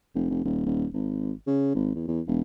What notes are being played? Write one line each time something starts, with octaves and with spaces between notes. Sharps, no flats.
F1
F1
D#1
D#1
G#1
C#3
G#1
E2
E2
E1